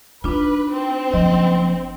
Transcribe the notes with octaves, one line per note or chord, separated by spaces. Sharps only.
D4 D#4 F4 B4
C4
F#1 F3 D#5